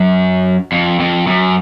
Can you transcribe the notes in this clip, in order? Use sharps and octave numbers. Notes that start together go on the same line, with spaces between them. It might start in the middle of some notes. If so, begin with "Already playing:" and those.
Already playing: F#2
F2
F2
F#2